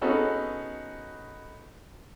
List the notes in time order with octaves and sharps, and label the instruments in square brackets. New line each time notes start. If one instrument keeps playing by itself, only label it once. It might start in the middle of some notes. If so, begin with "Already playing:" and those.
[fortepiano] B3 C#4 D#4 F#4 G#4 A4